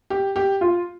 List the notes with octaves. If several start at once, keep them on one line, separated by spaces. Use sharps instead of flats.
G4
G4
F4